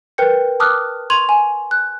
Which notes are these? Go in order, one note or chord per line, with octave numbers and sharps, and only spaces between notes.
A#4 B4 G5 G6 C#7
A5 D6 D#6 F6 F#6
C6 C#6 G#6 D#7 F7 F#7
G#5
F#6